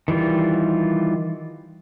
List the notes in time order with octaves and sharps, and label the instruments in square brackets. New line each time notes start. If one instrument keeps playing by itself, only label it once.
[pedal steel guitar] D#3 E3 G3 F4